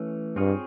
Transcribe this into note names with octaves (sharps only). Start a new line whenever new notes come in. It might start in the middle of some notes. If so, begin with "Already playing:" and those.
Already playing: E3 A3 C#4
G2 C4 F4 G#4 C#5